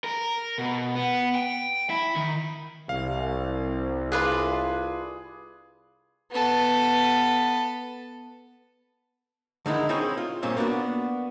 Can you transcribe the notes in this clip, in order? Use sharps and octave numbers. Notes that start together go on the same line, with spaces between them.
A#4
B2
B3
G5
E4
D#3
C2 F5
D4 F4 G#4 B4
B3 A4
D3 D#3 G#3 D#4 E4
C4 D#4 E4 G#4 C5 C#5
F4
G2 A#2 C4 C#4
A#3 B3 D4 F#4